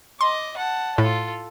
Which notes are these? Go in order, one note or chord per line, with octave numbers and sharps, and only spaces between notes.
D#5 C6 D6
F#5 A5
A2 F4 A4